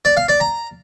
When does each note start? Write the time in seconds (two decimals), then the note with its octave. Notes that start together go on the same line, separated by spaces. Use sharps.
0.05 D5
0.17 F5
0.29 D5
0.40 A#5